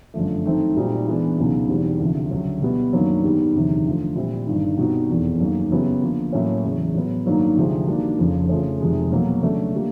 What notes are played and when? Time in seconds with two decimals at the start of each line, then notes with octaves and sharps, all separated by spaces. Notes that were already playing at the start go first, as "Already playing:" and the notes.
0.14 G1 F#2 D3 F3 A3
0.45 D#3 F#3 A3 C4 D#4
0.77 A#2 G3 C4 D#4 F#4
1.08 E3 G#3 B3 D4
1.38 C#2 B2 F#3 B3 D#4
1.69 E2 B2 G3 C4 D#4
2.00 D2 C3 F3
2.31 D2 C#3 F#3
2.62 B2 G3 B3 E4
2.93 F#2 D#3 F#3 A#3 D4
3.23 G#2 D#3 G3 B3
3.55 E1 D2 C3 D#3 F#3
3.86 D3 F3 A3
4.16 A#2 G3 C4 E4
4.47 G1 G2 D#3
4.78 B2 G3 C4 D#4 F#4
5.10 F1 E2 B2
5.40 F#2 D#3 F#3 A#3
5.71 C#3 F#3 B3 E4 G4
6.02 D3 F3 A#3
6.33 A2 F#3 A#3 C#4
6.64 E1 E2 C#3 F#3
6.94 A2 F#3 B3
7.26 G2 D#3 F#3 A#3 D#4
7.57 D2 C3 F3 G#3 C4
7.87 D#3 G3 A#3 D4 F#4
8.18 F1 F2 C#3 F3
8.49 C#3 F3 A3 C#4
8.80 F1 F2 C3 D#3 G#3
9.12 B2 F#3 A#3
9.42 C#3 F#3 A3 D4
9.74 D3 G3 A#3